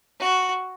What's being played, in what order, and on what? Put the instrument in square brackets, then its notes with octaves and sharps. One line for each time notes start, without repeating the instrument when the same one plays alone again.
[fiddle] F#4